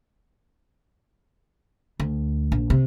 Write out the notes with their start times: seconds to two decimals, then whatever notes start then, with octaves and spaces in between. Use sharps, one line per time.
2.00 D2
2.52 A#1
2.70 C3